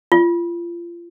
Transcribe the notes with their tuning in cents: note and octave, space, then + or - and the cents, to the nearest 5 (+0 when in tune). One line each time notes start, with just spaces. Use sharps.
F4 -30